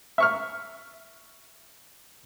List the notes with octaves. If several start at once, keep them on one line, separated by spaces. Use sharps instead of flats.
E5 C#6 F6